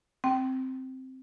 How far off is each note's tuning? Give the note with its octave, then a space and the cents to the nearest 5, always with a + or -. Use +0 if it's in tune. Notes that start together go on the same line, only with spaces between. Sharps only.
C4 +0 G5 -25